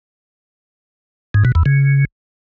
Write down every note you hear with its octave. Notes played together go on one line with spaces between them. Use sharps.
G#2
B2
E2
C#3